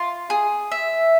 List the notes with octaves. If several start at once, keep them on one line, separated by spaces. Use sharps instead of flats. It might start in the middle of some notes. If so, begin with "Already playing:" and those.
Already playing: F4
G#4
E5